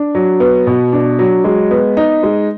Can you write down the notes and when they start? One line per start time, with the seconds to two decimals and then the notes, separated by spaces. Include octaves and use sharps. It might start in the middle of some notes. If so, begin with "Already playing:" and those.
Already playing: D4
0.15 F#3
0.40 B3
0.67 B2
0.93 D4
1.19 F#3
1.44 G#3
1.71 B3
1.97 D#4
2.23 G#3